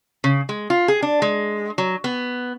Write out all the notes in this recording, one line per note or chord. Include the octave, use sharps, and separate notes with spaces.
C#3
G#3
F4
G#4
D4
G#3
F#3
B3